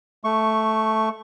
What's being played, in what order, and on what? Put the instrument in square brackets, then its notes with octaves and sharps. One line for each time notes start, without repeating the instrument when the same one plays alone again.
[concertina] A3 C#6